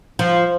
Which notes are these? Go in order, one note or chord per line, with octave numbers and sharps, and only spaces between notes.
F3